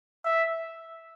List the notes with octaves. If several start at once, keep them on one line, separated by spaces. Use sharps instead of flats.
E5